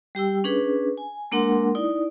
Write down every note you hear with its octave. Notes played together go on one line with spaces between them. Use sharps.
G3 G4 G5 E6
C#4 D4 G#4 B4
G#5
G#3 A#3 D4 A#4 F#5 C6
D#4 E4 D5 D#6